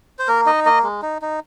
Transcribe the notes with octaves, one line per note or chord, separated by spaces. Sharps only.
C5
A#3 A#4
D#4 D#5
A#3 D#5
G#3
D#4
D#4